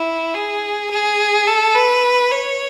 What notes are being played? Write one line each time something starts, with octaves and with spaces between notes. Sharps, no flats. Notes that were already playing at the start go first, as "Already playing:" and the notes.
Already playing: E4
G#4
G#4
A4
B4
C#5